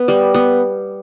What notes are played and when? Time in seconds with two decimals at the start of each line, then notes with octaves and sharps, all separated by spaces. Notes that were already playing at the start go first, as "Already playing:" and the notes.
Already playing: B3
0.08 G3
0.34 B3